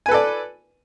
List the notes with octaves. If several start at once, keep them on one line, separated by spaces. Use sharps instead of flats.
A4 B4 D5 G#5